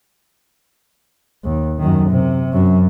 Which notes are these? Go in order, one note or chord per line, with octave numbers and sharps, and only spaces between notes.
D#2
F#2 D#3
C3
F#2